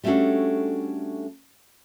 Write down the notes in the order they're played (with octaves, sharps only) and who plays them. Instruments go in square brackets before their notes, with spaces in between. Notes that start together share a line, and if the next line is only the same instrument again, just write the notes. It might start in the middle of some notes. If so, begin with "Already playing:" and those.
[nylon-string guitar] G3 A3 C#4 D4 F#4 A4